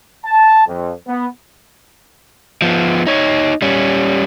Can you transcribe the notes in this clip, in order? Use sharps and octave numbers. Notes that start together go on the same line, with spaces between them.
A5
F2
B3
F3 B3
D#4 C#5
G3 C#4